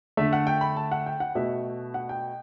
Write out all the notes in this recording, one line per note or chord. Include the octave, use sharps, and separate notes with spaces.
D3 A3 E5
F#5
G5
B5
A5
F#5
G5
F#5
B2 A3 E5
F#5
G5